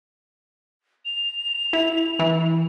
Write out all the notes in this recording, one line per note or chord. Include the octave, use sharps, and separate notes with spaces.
F7
E4
E3